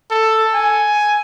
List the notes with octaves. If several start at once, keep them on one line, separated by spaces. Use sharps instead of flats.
A4
G#5